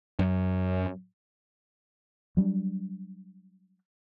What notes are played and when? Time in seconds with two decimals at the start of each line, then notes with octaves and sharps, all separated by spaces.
0.19 F#2
2.37 F#3 G3 C4 D4